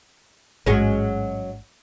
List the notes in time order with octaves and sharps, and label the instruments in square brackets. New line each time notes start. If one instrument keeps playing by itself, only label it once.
[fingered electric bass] A1 G#2 [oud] F#3 G#3 C#4